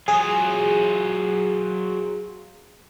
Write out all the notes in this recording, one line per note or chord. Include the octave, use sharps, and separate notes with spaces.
F#3 F4 G#4